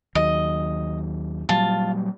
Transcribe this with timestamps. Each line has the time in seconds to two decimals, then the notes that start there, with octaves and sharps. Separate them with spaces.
0.15 D#2 D#3 F#3 D#5
1.49 A#2 F#3 G3 F4 A5